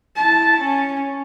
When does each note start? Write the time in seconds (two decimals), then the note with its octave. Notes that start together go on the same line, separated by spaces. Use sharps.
0.16 E4 A5
0.59 C#4